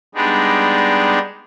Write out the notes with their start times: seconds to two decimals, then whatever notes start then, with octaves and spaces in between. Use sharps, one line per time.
0.15 G3 G#3 B3 D4 D#4